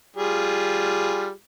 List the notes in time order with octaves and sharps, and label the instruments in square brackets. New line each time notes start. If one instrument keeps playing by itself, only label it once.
[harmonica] G3 F4 G#4